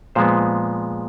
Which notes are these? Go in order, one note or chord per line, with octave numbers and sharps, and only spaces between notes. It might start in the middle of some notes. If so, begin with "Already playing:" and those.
A#2 F3 G#3 B3 C5